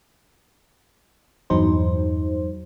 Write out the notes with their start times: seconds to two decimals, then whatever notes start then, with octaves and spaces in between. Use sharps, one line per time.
1.50 E2 G2 F#3 D#4 C5